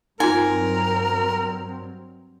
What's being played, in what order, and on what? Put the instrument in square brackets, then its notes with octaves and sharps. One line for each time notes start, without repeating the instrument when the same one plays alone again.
[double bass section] G2 F#3 C4 [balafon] D#4 F4 [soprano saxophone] A#4 [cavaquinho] G#5